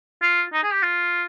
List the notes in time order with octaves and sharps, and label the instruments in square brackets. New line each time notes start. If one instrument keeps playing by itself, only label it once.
[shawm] F4
D#4
G#4
G4
F4